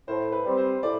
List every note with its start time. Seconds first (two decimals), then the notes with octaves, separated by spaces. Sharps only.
0.08 A2 C5
0.32 B4
0.45 G3 C4
0.57 C5
0.83 A2 D5